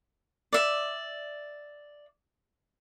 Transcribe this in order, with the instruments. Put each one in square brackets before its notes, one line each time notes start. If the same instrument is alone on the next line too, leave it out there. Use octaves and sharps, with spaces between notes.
[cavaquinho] D5 E5